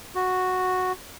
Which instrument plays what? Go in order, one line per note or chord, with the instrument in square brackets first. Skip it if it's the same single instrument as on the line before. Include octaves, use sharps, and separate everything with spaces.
[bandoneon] F#4